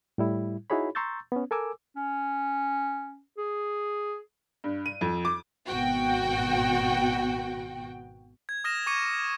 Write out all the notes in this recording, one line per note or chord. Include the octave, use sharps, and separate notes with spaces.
A2 G3 E4
D#4 E4 F#4 G#4 C#5 B5
A#5 C6 C#6 E6 G6 A6
B3 C#4
A4 A#4 G#5 D6 E6
C#4
G#4
G2
D#7
F2
D6
G#1 B2 F#4 G5
G#6
D#6 F6 A#6 D#7 E7
C#6 D6 G#6 C#7 D#7